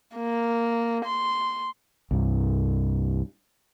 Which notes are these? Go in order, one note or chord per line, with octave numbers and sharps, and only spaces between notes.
A#3
C6
C2 G2